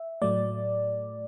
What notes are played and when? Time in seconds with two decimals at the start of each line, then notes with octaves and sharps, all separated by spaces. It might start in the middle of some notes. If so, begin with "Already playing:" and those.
Already playing: E5
0.22 A2 F#3 A3 D5